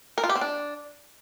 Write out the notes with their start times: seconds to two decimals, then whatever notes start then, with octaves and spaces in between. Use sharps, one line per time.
0.18 A#4
0.24 F4
0.29 G4
0.35 C4
0.41 D4